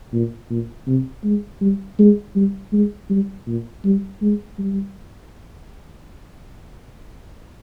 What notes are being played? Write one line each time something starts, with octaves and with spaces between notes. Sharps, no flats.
A#2
A#2
C3
G#3
G3
G#3
G3
G#3
G3
A#2
G3
G#3
G3